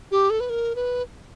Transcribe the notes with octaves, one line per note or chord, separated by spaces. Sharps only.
G4
A4
B4
A#4
B4